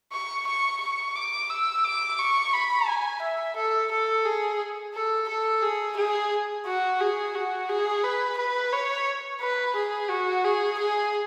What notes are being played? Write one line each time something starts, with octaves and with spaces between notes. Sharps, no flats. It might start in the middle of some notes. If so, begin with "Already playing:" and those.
C#6
C#6
C#6
D6
E6
D6
C#6
B5
G#5
E5
A4
A4
G#4
A4
A4
G#4
G#4
F#4
G#4
F#4
G#4
B4
B4
C#5
B4
G#4
F#4
G#4
G#4